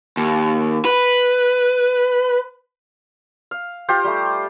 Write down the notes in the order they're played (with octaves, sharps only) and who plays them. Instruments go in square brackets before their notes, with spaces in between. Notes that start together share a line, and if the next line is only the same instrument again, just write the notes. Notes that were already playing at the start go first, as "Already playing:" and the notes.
[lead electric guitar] D#2
B4
[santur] F5
F4 G4 C5 G5
G3 A3